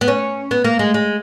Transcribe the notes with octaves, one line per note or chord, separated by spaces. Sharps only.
B3
C#4
B3
A#3
G#3
G#3